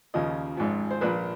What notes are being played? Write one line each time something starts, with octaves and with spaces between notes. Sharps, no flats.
D#2 C#3 F3 D#5
G#1 G#2 F3
C5
A#1 A#2 F3 B4